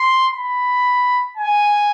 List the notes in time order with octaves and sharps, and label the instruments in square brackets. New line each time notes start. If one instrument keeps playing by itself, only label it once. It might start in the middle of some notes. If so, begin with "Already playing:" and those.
Already playing: [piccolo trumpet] C6
B5
G#5